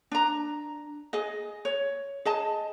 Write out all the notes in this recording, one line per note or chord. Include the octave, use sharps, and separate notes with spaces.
D4 A#5
G#4 D#5
C#5
G#4 D#5 A5